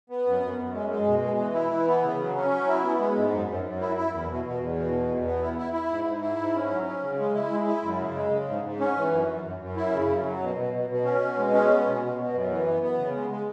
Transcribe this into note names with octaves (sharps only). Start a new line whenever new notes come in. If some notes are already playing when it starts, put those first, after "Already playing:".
B3
F#2
F#2
F#2
G#3
G#3
B2
G#3
E3
E4
E3
B3
C#3
F#3
C#4
F#3
E4
B3
G#3
G#2
F#2
F#2
F#2
E4
E4
E2
B2
B2
E2
B2
E2
E2
B3
E4
E4
E4
G#2
G#2
E4
G#2
C#4
F#3
C#4
C#3
G#3
E4
G#3
E4
F#2
C#3
G#3
C#3
G#2
G#2
C#4
E3
F#2
F#2
F#2
F#2
E4
C#3
F#2
F#3
B2
B2
B2
B2
C#4
B2
G#3
C#4
B3
B2
B2
B2
F#2
E3
B3
B3
C#3
G#3
G#3